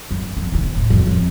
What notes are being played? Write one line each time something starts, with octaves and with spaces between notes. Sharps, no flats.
F#2
F2
D#2 C3
A2
F2 F#3
F2